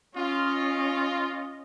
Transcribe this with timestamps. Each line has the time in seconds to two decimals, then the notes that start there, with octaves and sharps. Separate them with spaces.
0.16 C#4 F4 D#5